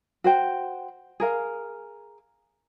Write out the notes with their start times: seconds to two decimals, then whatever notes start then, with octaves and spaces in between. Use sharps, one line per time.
0.24 F#4 C5 G5
1.20 G#4 A#4 F5